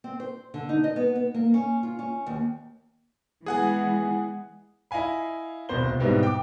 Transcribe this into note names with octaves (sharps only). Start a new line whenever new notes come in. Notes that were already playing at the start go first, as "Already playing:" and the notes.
C4
C5
D3
D#4
D#5
B3
B3
A#3
C#4
F4
C#4
D#2
E3 G#3 B3 G#4 F#5 G#5
E4 D#5 F5 G#5 B5
D#1 C2 B2 C5 G7
G#2 B2 G3 B3 C4 E4
G5 D6